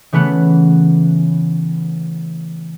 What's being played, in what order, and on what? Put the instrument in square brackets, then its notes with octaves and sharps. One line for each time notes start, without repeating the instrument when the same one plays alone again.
[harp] C#3 E3 A3 B3 F#5